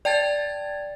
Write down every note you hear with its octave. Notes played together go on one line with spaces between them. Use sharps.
D5 G5 A5 G#6 A6